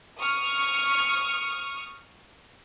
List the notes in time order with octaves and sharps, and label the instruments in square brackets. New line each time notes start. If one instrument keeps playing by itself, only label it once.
[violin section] C#6 D#6 F6